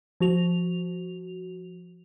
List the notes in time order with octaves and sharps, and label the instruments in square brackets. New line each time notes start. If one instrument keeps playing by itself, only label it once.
[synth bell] F3 F#4 F7